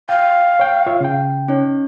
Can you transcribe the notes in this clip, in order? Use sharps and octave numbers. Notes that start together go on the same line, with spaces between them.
F5 G5
C#5 G5
F4 C#5 E5
C#3 G5
C#4 D#4 C#5